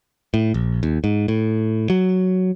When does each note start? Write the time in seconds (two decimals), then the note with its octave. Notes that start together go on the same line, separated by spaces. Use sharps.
0.34 A2
0.54 A#1
0.83 D#2
1.04 G#2
1.28 A2
1.90 F#3